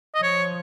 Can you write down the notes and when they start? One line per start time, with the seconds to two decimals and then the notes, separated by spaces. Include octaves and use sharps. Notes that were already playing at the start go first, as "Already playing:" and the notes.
0.15 D#5
0.22 F3 C#5